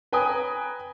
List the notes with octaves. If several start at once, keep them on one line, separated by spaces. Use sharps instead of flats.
B4 G5 G#5 A#5 D#6